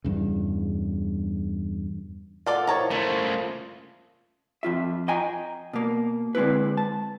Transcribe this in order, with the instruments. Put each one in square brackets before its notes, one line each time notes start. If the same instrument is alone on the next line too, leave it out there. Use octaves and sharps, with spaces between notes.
[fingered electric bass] E2 G2 C#3
[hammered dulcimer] A#2 F#5 [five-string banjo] F4 A4 D5
[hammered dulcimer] F3 E4 [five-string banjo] C#5 A5 A#5
[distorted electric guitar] C#3 A3 [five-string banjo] E4 [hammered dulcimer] F4
[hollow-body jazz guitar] F2 F4 E5
D#5 G5 G#5 A#5
B2 A#3
D3 G#3 C4 E4 B4
A5